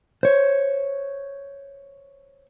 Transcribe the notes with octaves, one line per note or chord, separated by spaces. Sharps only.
C5 C#5